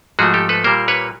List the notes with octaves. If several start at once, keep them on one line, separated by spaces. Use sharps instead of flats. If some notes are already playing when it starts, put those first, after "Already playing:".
G#2 F3 A3 F#4 G#4
G4 A4
A4 B4
A#2 G3 A#3 A#4 C5
B4 C#5